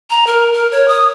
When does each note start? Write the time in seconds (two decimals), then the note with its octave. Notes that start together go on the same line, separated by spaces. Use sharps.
0.10 A#5
0.27 A#4
0.53 A#4
0.72 C#5
0.88 D#6